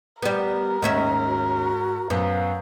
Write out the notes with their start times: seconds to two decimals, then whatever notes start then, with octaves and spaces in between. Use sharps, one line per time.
0.22 G3 B3 A#4
0.82 D#2 G#2 C#4 D#5 E5
1.27 F#4
2.10 F#2 B3 F5